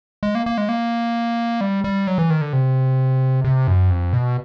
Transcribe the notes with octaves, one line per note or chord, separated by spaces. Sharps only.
G#3
A#3
A#3
G#3
A#3
G3
G3
F#3
E3
D#3
D3
C3
C3
F#2
F2
B2